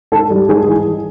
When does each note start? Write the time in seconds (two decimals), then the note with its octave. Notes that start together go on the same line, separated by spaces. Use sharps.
0.12 G#2 A4 A5
0.30 G3
0.49 G#2 G#4 G#5
0.68 E3